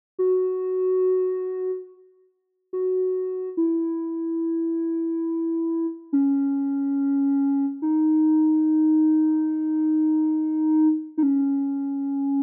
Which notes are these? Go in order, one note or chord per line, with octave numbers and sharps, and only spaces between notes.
F#4
F#4
E4
C#4
D#4
D#4
C#4